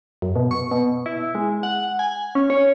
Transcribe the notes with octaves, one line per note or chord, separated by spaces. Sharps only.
F#2
B2
C#6
B2
E4
G#3
F#5
G#5
C#4
C#5